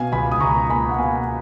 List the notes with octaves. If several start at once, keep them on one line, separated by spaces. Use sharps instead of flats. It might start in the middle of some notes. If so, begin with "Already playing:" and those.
Already playing: B2 F5 G#5
C#2 G#5 B5
D#6
C#2 A#5 C#6
A#3 G#5 B5
F#5
B2 F5 G#5